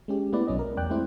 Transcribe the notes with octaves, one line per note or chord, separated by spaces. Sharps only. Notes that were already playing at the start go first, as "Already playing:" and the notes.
G#3 C#4 G4
A3 B3 E4 B4 D5
B1 F#3 C#4 D#5
A#4
E2 D5 G5 F#6
G#3 A3 C4 E4 C5